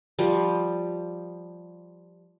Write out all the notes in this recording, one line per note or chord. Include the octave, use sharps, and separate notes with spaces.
F3 G3